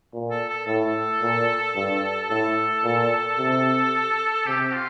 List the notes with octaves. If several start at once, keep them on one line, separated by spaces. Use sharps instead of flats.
A#2
A4
A4
A2 A4
A#2
G2
A2 A4
A#2
C3
C3 G4
F4